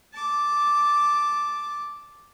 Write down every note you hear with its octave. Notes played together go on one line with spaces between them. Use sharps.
A5 D6